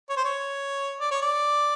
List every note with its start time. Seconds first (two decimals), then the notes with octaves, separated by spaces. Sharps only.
0.10 C#5
0.16 C5
0.25 C#5
1.01 D5
1.11 C#5
1.22 D5